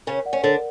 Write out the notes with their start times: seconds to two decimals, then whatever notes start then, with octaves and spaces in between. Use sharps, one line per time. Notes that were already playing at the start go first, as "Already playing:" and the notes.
0.07 C#3 C#4 A#4
0.25 D5 F#5
0.33 C#4
0.44 D3 D4 A#4